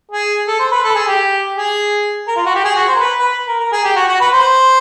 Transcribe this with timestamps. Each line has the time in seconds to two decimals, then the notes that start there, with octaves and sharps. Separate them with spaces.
0.12 G#4
0.48 A4
0.59 C5
0.72 B4
0.84 A4
0.95 G#4
1.08 G4
1.56 G#4
2.28 A#4
2.37 F4
2.46 F#4
2.55 G4
2.64 G#4
2.76 F#4
2.88 C5
2.95 A#4
3.00 B4
3.18 B4
3.48 A#4
3.60 A#4
3.72 G#4
3.84 G4
3.96 F#4
4.08 F#4
4.21 B4
4.33 C5